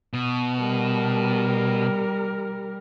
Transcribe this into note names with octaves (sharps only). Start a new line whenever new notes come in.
B2
G3 A#4